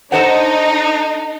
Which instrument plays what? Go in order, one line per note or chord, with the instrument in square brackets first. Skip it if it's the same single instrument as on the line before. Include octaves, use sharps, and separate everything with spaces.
[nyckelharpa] D4 D#5 [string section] D#4 [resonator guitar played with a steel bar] A4 C5 F#5